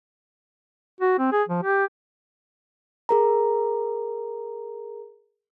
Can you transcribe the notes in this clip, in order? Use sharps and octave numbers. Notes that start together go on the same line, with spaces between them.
F#4
C4
G#4
F3
G4
G#4 A#4 A#5